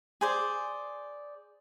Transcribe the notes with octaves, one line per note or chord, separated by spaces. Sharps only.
G#4 C5 D5